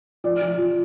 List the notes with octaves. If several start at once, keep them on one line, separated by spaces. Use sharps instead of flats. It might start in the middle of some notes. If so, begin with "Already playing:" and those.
F3 D5
F3
F3